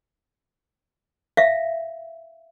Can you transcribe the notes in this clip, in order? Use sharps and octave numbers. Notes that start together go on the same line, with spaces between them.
E5 F5